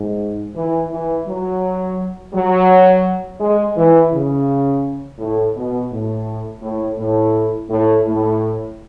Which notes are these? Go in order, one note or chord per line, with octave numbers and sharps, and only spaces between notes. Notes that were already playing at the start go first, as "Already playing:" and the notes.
Already playing: G#2
E3
E3
F#3
F#3
G#3
E3
C#3
A2
B2
A2
A2
A2
A2
A2